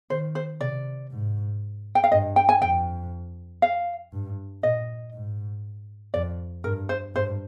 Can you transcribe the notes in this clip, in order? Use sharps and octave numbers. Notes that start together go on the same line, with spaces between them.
D#3 C5
C5
C3 D5
G#2
G5
F5
G2 D#5
G5
G#5
F2 G5
F5
G2
A#2 D#5
G#2
F2 D5
G2 A#4
C5
G2 C5